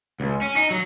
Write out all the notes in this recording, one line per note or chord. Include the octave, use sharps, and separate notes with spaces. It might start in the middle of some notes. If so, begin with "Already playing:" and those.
C#2
C#4
D#4
F#3